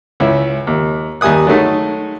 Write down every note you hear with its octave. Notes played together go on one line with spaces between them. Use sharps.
C#2 C#4 E4
D#2
D#2 G3 G#5 D#6 F#6
F#3 G#3 A3 D#4